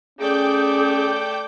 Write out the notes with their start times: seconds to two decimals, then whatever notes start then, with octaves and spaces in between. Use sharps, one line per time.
0.19 A3 C#4 G#4 D5 G5 D6 G6